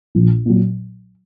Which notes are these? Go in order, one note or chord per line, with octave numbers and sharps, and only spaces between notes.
A#1
A#2 F#3